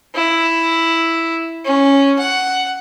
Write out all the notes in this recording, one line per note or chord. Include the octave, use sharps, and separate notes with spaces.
E4
C#4
F#5